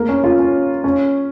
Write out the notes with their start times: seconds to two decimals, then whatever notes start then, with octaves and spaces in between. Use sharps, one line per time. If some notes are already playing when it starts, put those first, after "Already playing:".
Already playing: A#3
0.09 C#4
0.24 F4
0.39 C#4
0.84 C#4